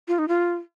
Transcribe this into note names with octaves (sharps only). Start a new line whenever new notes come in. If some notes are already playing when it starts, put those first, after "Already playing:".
F4
D#4
F4